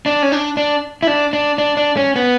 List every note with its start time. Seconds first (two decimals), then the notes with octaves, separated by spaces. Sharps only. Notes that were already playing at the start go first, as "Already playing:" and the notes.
0.06 D4
0.22 C#4
0.32 D4
0.57 D4
1.03 E4
1.07 D4
1.33 D4
1.58 D4
1.77 D4
1.97 C#4
2.16 B3